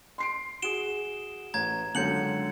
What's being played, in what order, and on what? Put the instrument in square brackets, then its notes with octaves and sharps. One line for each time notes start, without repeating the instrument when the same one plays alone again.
[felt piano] C6 C7 D7
[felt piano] F#4 G#4 [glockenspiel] D7 E7 G7
[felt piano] A1 [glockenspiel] A#5 G#6
[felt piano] C#2 F#2 D3 [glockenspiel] G6 C#7 F#7